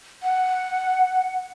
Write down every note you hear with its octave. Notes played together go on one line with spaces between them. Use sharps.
F#5